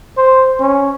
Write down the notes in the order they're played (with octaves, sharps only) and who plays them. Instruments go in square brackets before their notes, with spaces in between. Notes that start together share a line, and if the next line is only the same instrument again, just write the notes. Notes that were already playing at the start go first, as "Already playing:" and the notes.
[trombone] C5
C#4